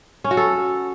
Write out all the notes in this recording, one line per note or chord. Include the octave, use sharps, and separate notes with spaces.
C#4
F#4
A4